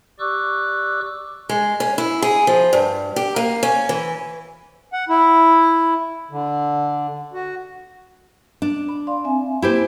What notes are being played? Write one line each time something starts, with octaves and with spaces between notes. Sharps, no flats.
G4 D5 C#6 D6 E6 F#6
G#3
C#4
E4
G#4
F3
G2
G4
A#3
C#4
E3
F#5
E4
D3
F#4
D4
B5
D5 F5 C6
C4 E5 G#5
A#3 E4 G4 C5 B5